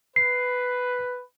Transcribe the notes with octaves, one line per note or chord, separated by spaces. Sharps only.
B4 C7